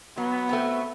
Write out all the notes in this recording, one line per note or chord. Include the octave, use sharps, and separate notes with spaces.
F#3 B3
A3 C4 F#4